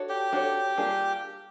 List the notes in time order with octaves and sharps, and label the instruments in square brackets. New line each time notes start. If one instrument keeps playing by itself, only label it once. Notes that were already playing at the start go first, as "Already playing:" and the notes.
Already playing: [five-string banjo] D4 F#4 A4 C#5
[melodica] G4
[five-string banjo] D4 F#4 A4 C#5
G3 A#3 D4 F4 G#4